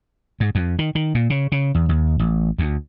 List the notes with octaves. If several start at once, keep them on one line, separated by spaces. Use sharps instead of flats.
G#2
F2
D#3
D#3
A#2
C#3
C#3
E2
D#2
A1
D2